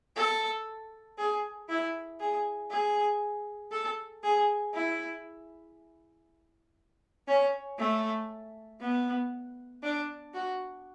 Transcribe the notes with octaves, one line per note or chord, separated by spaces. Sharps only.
A4
G#4
E4
G#4
G#4
A4
G#4
E4
C#4
A3
B3
D4
F#4